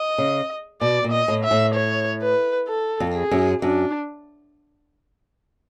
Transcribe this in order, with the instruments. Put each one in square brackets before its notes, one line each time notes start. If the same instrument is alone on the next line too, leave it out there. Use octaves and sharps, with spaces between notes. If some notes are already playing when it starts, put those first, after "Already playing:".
Already playing: [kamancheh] D#5
[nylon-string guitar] C#3
[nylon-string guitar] B2 [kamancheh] D5
[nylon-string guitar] A#2
[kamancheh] D#5
[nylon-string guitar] A2
[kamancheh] E5
[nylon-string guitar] A2
[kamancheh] C#5
B4
A4
[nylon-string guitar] F2
[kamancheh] G#4
[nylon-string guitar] F#2
[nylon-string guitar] F#2 [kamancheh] D4